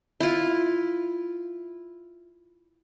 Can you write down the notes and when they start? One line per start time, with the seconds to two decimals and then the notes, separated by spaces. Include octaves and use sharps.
0.20 E4 F4